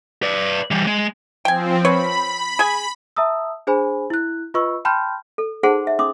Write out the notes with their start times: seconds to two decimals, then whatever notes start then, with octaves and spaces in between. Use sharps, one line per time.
0.23 B4 D5
0.71 E3 G3
0.87 G#3
1.45 F3 C4 G5 G#5
1.85 B4 C#5 B5
2.59 G#4 G#5
3.16 E5 A5 A#5 D#6 E6
3.67 D4 G#4 C5 G#5 B5
4.10 E4 F#6
4.54 F4 B4 D#5 B5 C#6 E6
4.85 G5 A5 B5 C6 F6 G6
5.38 A4
5.63 D#4 G#4 C5 F#5 A5 C6
5.87 E5
5.99 C#4 C6 D6 D#6